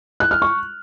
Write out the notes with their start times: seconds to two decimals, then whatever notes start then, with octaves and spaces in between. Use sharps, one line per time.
0.20 F#6
0.31 F6
0.42 C#6